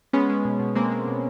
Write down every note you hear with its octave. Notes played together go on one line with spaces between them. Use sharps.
G#3 B3 C#4
G#3
B2
B2
G#3 A#3 C4
G#3
B2